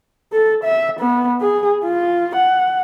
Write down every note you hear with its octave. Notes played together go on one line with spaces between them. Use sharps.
A4
E5
B3
G#4
F4
F#5